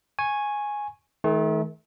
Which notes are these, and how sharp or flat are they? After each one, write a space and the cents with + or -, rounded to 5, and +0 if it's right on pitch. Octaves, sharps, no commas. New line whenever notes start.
G#5 +0 C#6 -15
D#3 +30 A3 -35